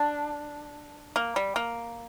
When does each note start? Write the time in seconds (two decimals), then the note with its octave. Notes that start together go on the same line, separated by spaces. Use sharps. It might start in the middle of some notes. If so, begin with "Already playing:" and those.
Already playing: D4
1.16 A#3
1.36 G3
1.56 A#3